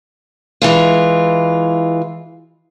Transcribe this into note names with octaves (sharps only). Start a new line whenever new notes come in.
E3 G#3 F4